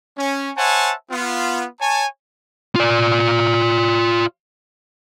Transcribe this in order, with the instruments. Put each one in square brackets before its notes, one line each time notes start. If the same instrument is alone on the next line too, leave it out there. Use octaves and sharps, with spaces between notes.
[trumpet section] C#4
C5 C#5 E5 F#5 G#5 A5
B3 F4
C#5 G#5 A5
[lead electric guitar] F4 D5